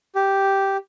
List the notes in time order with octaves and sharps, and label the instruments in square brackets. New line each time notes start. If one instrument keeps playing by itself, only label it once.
[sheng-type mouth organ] G4